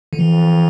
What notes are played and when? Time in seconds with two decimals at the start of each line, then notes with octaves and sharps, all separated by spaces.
0.13 D3
0.18 F2 E3